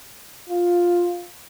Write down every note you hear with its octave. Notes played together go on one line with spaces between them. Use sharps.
F4